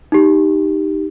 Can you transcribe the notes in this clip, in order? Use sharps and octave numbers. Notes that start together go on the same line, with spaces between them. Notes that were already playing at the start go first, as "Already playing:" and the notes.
D#4 G4